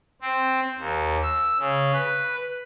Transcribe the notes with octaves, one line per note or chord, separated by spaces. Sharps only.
C4
D#2
E6
C#3
B4